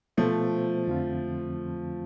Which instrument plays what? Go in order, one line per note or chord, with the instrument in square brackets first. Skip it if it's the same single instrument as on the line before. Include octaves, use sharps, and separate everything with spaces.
[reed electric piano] B2 B3 F4 A4 C5 [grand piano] F3 A3
[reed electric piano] F2 D3 F3 C4 F4